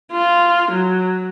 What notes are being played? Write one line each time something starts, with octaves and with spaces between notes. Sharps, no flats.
F4
F#3